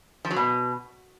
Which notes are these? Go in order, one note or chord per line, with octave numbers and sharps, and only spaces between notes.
F3
F#3
B2